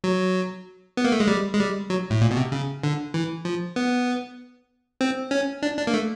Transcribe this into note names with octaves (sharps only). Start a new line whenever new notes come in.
F#3
B3
A#3
A3
G#3
G3
G#3
G3
F#3
A2
A#2
B2
C3
C#3
D3
E3
F3
B3
C4
C#4
D4
D4
A#3
A3